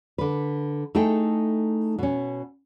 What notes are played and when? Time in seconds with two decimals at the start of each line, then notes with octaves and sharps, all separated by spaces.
0.18 D3 B4
0.95 A3 D#4 E4 G#4 A4 G5
1.99 B2 C#4